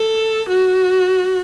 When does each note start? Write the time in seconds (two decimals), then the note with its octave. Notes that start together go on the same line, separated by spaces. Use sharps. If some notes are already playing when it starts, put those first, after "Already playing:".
Already playing: A4
0.49 F#4